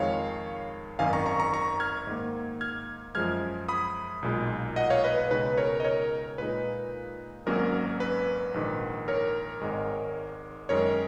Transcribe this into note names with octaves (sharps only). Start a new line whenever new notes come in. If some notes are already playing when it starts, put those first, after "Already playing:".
Already playing: F2 D#3 G#3 C#5 F5
G#1 F#2 D#3 F5 G#5
A#5 C#6
A#5 C#6
A#5 C#6
A#5 C#6
F6 G#6
G#2 D#3 A#3
F6 G#6
F#2 F3 G#3 F6 G#6
B5 D#6
B1 A#2 G#3
D#5 F#5
C#5 F5
B4 D#5
B4
C#2 B2 G#3 D#4 B4
A#4 C#5
D#5
A#4 C#5
A#2 G#3 D#4 B4
G#1 G#2 F#3 A#3 C#4 A#4
B4
A#1 G#2 D#3
A#4 C#5
G#1 G#2 D#3 G#3
F#2 D#3 G#3 A#4 C#5